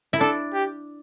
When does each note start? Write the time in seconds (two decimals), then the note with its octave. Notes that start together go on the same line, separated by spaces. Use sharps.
0.13 E4
0.20 D4 A4
0.54 G4